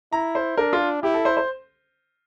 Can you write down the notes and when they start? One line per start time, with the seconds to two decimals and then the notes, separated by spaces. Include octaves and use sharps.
0.13 E4 A#5
0.35 C5
0.57 D4 A#4
0.73 F4
1.03 E4 G4
1.14 A4
1.25 C5
1.37 C5